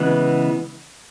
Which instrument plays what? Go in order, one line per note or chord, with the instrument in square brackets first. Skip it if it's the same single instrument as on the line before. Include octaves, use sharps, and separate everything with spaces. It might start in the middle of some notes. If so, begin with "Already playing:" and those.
Already playing: [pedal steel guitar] C#3 E3 G#3 B3